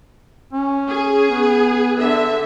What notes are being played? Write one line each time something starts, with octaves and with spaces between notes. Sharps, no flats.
C#4
G#4
B3
D3 E5